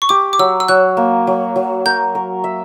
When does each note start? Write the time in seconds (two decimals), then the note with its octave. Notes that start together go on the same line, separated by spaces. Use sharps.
0.02 C#6
0.09 G4 D6
0.33 D6
0.39 F#3 E6
0.60 E6
0.68 F#3 F#6
0.97 A#3
1.27 F#3
1.56 F#3
1.85 A#4 G6
2.15 A#4
2.44 E5